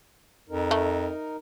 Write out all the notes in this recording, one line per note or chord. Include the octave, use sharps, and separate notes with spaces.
F2 D#4 A#4
A3